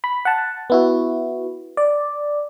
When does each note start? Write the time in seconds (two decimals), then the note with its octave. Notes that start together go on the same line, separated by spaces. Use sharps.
0.04 B5
0.25 F#5 A5
0.70 B3 E4 F#4
1.77 D5